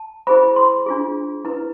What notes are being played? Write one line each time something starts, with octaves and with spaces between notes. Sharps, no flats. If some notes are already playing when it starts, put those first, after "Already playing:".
Already playing: A5
E4 G#4 C5 B5
C6
D4 F4 G#4
E4 B4